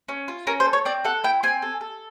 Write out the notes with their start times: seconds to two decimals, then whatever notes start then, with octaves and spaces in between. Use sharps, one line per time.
0.08 C#4
0.28 F4
0.47 C#4 A#4
0.60 C5
0.66 A4
0.73 C#5
0.85 C4 D5
1.04 A4 F#5
1.24 E4 G5
1.43 C4 G#5
1.62 A4
1.81 A4